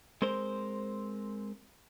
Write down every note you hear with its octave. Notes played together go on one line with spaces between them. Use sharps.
G#3 C4 A#4 C5